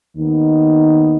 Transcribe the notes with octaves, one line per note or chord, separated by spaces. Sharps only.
D#2 D#3 B3 D#4